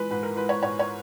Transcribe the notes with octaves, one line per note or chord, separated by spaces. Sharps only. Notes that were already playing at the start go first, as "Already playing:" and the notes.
Already playing: E3 G#3 B4
G#2 B4
A#4
E3 G#3 B4
C#5
G#2 C#5
C#5